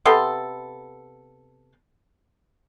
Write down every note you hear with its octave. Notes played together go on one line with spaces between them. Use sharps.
C3 B3 A4 C6